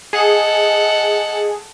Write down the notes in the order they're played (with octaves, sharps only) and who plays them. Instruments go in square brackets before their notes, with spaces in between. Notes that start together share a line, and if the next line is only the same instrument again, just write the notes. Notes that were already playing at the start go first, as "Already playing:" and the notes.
[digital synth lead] G#4 [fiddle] A4 F#5 [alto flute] D#5